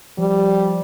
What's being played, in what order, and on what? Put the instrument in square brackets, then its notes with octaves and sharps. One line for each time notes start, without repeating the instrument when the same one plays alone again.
[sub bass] F3 [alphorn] G3